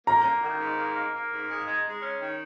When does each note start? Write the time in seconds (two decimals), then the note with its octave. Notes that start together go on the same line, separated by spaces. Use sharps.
0.07 A#3 A#5
0.25 A#3
0.42 D#3
0.60 G#2
0.78 A#3
0.96 A#3
1.14 A#3
1.32 G#2
1.50 G#3
1.67 G#3
1.86 G#3
2.03 C#4
2.21 D#3